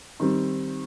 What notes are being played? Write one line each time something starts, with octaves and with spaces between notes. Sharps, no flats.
D#3 G3 C4